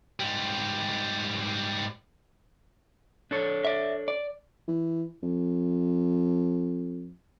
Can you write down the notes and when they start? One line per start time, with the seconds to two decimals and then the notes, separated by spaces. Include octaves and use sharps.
0.20 G#2 G3
3.31 D4 A4 C#5
3.65 D5 E5
4.08 D5
4.68 E3
5.23 F2